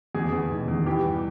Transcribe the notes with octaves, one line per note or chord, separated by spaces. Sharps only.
E2 G#4
E2
D#3
E2
E3 G4
G2